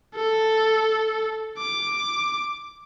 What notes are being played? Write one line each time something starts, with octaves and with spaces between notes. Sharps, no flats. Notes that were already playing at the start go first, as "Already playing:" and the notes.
A4
D6